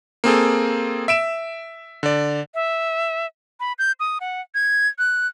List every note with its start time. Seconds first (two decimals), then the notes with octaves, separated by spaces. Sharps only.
0.24 A#3 C4 G#4 A4
1.08 E5 D7 E7
2.03 D3 D5
2.55 E5
3.60 B5
3.79 G6
4.00 D#6
4.20 F#5
4.55 G#6
4.99 F#6